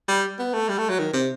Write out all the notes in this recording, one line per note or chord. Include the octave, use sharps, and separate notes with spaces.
G3
B3
A3
G3
A3
F#3
D#3
C3